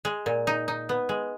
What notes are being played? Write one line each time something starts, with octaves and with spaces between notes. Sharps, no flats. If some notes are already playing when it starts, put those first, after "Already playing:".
G#3
A#2
D#4
D#4
B3
G#3